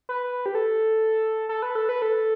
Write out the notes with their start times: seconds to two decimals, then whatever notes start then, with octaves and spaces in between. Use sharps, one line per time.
0.09 B4
0.46 G4
0.55 A4
1.49 A4
1.62 B4
1.75 A4
1.89 B4
2.02 A4